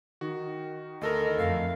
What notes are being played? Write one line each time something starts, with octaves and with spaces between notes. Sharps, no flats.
D#3 F#4
D2 A4 A#4 D#5
F2 A3 F5